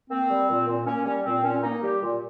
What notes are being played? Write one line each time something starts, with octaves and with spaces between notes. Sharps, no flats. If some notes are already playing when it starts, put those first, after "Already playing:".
A#3 C4
G3
A#2
A#2
A#3 C#4
G3 C#4
A#2 C4
A#2 C#4
A#3 D#4
G3 G4
A#2